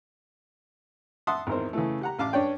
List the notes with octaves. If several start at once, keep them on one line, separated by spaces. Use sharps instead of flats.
E5 F#5 A5 C6 D#6
G#1 E2 A#4 C5
C#3 E3 A3
G4 F#5 A#5
A1 F5 A5 D6
G2 C#4 D4 C#5 D5 G5